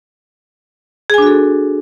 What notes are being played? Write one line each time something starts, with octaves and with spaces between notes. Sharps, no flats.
D4 F#4 G#4 A4 G#5